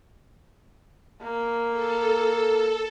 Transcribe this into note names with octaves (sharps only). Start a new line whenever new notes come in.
A#3
A4